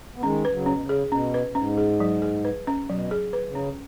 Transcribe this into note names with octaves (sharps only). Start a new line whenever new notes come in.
B3
D#3 G#3 C#4
B4
C#3 F#3
C#4
B2
C#3
G#4
B2 C#4
B4
B2
G#2 C#4
G#4
F#3
G#4
B4
C#4
B2 F#3
G#4
B4
C#3
C#4